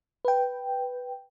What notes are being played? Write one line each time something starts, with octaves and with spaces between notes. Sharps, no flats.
B4 G5